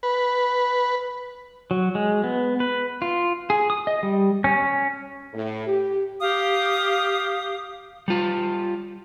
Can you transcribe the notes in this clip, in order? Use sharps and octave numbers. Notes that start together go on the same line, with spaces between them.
B4
F#3
G#3
B3
B4
F4
G#4
D#6
D#5
G3
C#4
A2
G4
G4 F5 D#6
G3 F4